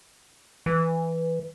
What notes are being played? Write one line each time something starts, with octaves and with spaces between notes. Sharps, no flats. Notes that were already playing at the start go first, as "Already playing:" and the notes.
E3